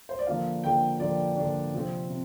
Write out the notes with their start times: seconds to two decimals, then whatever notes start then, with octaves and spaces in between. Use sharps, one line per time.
0.09 C5
0.19 D5
0.27 D3 F3 A#3 D4 F5
0.64 D3 F3 A#3 D4 G5
1.00 D3 F3 A#3 D4 D5
1.37 D3 F3 A#3 D4
1.74 C3 F3 C4
2.10 C3